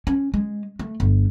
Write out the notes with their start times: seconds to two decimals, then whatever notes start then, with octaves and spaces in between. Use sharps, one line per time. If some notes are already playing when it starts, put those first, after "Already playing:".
0.07 C#4
0.34 G#3
0.79 A3
1.00 G1